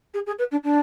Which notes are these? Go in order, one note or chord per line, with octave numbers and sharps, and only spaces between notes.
G#4
G#4
B4
D4
D4